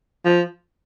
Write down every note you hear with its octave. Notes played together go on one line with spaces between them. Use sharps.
F3